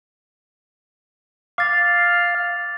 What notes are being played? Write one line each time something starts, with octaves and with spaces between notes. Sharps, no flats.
F5 D6 A6